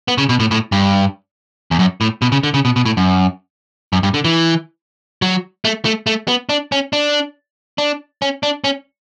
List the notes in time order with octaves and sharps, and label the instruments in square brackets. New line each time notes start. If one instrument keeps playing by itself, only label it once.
[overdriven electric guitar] B3
C#3
B2
A2
A2
G2
E2
F#2
A2
B2
C#3
D3
C#3
B2
B2
A2
F#2
F#2
G2
D3
E3
F#3
A3
A3
A3
B3
D4
C#4
D4
D4
C#4
D4
C#4